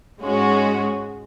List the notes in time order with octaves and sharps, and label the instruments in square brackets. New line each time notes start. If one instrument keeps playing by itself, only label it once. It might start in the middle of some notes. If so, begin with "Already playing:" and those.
[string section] G#2 G#3 C#4 F#4